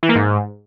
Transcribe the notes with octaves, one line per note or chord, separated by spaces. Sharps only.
E3
A#3
G#2